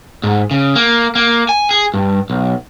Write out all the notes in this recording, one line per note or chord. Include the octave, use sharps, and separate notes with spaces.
G#2
C#3
A#3
A#3
G#5
G#4
G2
B1